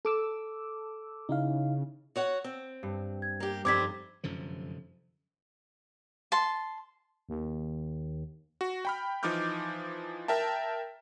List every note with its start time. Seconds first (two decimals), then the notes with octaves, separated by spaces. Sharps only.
0.05 A4 D6 E6
1.29 C#3 D#4 E4 F5
2.16 F#4 C#5 F#5
2.44 C4
2.83 G2
3.22 G#6
3.40 A#3 G4
3.65 F1 G2 D#3 G3 C4 D6 G#6 B6
4.24 F1 F#2 D3 F3
6.32 A5 C6
7.29 D#2
8.61 F#4
8.85 G5 B5 F6
9.23 E3 F3 D#4 D6 F6 G6
10.28 A#4 E5 G5 A5